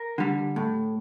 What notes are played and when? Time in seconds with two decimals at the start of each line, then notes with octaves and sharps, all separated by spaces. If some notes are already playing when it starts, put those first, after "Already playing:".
Already playing: A#4
0.18 D3 G3
0.56 A2